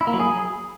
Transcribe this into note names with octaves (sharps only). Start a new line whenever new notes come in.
E4
A#3
F#3
G#4